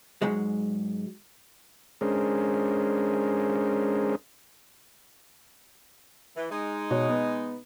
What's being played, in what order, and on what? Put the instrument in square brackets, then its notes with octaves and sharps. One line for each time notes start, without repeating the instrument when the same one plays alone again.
[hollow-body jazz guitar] G#2 F#3 G#3
[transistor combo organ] G#3 C#4 D4 G#4 A#4 C5
[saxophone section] E3
G#3 D#4
[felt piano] B2 F#4 C#5
B3